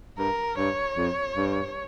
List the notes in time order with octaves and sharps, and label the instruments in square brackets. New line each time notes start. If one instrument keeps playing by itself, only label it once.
[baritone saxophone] G2 [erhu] A#4
[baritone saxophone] G2 [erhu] C#5
[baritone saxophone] F2
G2